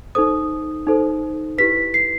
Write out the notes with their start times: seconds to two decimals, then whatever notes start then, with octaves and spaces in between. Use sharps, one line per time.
0.15 D#4 A4 C5 D#6
0.87 D#4 A4 C5
1.58 E4 G4 B4 B6
1.94 C7